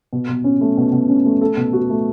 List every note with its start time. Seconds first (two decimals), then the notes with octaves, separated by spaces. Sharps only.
0.13 B2
0.29 B2
0.44 C#4
0.61 A3
0.77 B2
0.92 B2
1.09 C#4
1.25 A3
1.41 A4
1.57 B2
1.73 F#4
1.90 A3